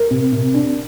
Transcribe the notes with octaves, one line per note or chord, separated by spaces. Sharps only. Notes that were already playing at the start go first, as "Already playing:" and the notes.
Already playing: A#4
C3
C3
D4